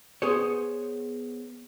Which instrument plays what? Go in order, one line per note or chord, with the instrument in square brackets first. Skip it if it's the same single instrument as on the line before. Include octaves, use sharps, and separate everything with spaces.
[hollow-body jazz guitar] B3 G#4 C5 C#5